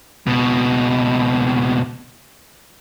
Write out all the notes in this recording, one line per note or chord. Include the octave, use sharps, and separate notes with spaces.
C#2 B2